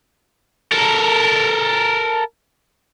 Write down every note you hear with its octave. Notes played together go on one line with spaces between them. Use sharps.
A4 A#4